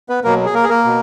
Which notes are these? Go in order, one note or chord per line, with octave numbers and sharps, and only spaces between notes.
B3 B4
B2 F#3 A#3 A#4
G#4
A#3 A#4
G#4
A#3 A#4
B2